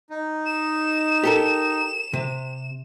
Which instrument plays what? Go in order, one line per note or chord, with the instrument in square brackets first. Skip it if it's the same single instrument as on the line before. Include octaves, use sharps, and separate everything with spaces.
[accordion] D#4
[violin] E7
[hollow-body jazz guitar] G4 A4 A#4
C3